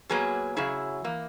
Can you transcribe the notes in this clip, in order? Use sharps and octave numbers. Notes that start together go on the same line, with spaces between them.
B2 F#3 A#3 G#4 B4
F#2 C#3 F#3 E4 G#4
E3 A#3